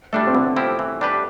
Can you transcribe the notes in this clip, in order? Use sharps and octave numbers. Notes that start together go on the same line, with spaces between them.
G3 A3 D4 A4
C4
D3 B3
F3 C4 E4 G4
E3
G3 D4 G4 B4